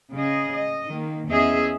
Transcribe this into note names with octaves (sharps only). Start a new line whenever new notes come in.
C#3 G#4 D#5
D#5
D#3 A#3
E2 C#4 G#4 D#5 E5